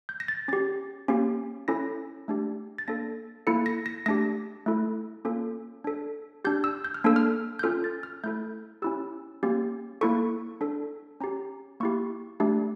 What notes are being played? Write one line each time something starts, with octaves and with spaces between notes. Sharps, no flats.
G6
A#6
A6
C#4 G4 A6
A#3 C#4 G4
C#4 E4 A4 A#6
A3 D4 G4
A6
A#3 D4 A4 A#6
A#3 E4 A4 C#7
A#6
A#6
A3 D4 G4 A#6
A3 E4 A4
A#3 C#4 F4 A4
D4 A4
D4 G4 G6
E6
G6
F6
A#3 D4 A4 E6
F6
G6
C#4 F4 A4 F6
A6
F6
A3 E4 A4 G6
C#4 E4 G4 E6
A#3 C#4 G4
A#3 E4 A4 C#6
D4 A4
C#4 G4 A#5
A#3 E4 G4 C#6
A3 D4 G4